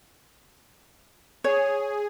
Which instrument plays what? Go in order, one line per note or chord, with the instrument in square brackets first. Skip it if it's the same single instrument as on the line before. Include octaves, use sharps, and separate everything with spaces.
[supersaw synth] G#4 [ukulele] C#5